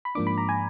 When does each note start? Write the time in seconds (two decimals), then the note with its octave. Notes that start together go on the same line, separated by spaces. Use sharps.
0.05 B5
0.15 G#2 F3 A#3 D4 D6
0.27 B5
0.38 A#5
0.49 G#5